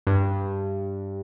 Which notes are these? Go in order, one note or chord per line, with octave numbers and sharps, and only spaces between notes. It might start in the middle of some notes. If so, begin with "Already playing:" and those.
G2